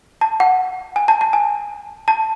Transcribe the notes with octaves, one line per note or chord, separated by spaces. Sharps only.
A5
F#5
G#5
A5
A5
G#5
A5